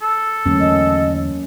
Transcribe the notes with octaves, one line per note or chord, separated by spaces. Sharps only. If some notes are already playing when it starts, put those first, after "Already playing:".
A4
E2 D3 F#3 A3 A#3 C#4
D#5